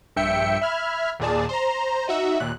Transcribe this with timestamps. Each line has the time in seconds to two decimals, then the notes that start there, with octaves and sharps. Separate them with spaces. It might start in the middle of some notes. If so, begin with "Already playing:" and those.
0.16 A#1 G2 E5 G5 C#7
0.62 E5 B5 F6 G#6
1.19 D#2 A#2 G#4 D5 A5
1.49 C5 A#5
2.08 D#4 F#4 E5
2.40 D#2 A#2 F#6